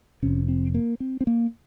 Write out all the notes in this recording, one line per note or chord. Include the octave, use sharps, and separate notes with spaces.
F1 F2 C3 C#4
C4
A#3
C4
C4
A#3